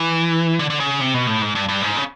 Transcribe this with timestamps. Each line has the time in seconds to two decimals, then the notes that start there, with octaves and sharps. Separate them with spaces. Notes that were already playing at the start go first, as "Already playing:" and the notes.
Already playing: E3
0.59 D3
0.70 D3
0.80 C#3
1.01 C3
1.14 B2
1.27 A2
1.42 G#2
1.55 G2
1.69 G2
1.82 G#2
1.96 C#3